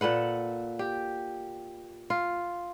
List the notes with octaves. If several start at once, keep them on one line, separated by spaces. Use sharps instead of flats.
A#2 A4 B4 F#5
G4
F4